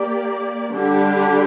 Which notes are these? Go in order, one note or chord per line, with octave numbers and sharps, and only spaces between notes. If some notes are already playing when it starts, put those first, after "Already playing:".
Already playing: A#3 G4 D5
D3 G3 D4 G4